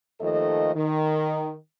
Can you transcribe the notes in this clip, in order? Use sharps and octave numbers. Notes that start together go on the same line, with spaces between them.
D#2 D#3 F3 A3 A4 D#5
D#3